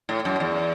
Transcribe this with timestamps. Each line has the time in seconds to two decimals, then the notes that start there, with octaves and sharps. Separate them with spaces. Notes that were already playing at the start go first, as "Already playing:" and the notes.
0.09 A2
0.25 F#2
0.40 E2